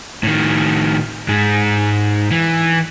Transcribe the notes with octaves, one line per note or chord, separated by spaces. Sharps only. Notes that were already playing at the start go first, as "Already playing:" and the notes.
A2 D#3
G#2 G#3
E3